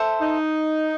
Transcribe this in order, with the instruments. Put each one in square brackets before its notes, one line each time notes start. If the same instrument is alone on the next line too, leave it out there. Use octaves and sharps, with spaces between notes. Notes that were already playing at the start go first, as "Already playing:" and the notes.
Already playing: [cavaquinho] A4 C5 E5
[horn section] D#4